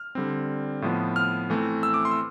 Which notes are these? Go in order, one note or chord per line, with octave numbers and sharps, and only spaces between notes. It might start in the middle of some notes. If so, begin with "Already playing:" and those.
Already playing: F6
D3 G3 C4
A2 F3 B3
F6
E3 A3 C4
E6
D6
C6
E6